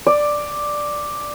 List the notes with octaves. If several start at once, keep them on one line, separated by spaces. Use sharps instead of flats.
D5